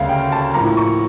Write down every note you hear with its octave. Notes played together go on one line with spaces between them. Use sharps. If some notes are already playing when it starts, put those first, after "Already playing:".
Already playing: D2 C#3 G3 A#3 F5
G5
A5
A2 F3 A#3 A#5
C#6